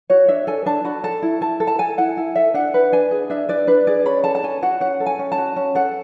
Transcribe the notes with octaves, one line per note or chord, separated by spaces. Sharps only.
F#4 C#5
D4 E5
A4 G#5
D4 A5
F#4 B5
A4 A5
E4
E4 A5
A4
A5
A4 G#5
E4 F#5
E4
A4 E5
D4 F#5
B4
D4 G#5
G#4
D4 E5
B4 D5
D4 B4
G#4 D5
C#4 B5
A4 A5
A5
C#4 G#5
F#4 F#5
C#4 F#5
A4
G#5
C#4
A5
F#4
C#4
A4 F#5